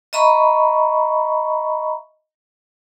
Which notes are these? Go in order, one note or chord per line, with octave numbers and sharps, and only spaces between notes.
D#5 E5 A#5 B5 C#6